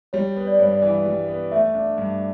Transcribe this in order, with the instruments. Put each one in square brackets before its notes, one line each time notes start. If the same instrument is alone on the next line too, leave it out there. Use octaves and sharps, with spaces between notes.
[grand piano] G3 [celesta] C#5
[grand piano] B3
[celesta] D5
[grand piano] G2 [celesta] C#5
[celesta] D5
[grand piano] E3
G3
B3
[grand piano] A3 [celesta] E5
[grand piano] D4
G2